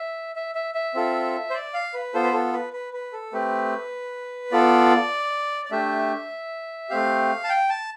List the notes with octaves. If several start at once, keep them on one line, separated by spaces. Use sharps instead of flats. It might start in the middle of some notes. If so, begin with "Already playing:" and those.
Already playing: E5
E5
E5
E5
C4 F4 A4
C5
D5
F5
B4
B3 F4 A4 C5
B4
A4
B4
B4
B4
A4
A3 C4 G4 B4
B3 F4 A4 D5
D5
A3 D4 G4 E5
A3 C4 G4 F5
A5
G5
A5